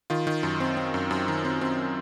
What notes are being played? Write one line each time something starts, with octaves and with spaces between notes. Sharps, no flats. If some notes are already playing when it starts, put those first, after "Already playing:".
D#3 F4
D#3
F#2
C4
C4
F#2
F#2
D#3
C4
C4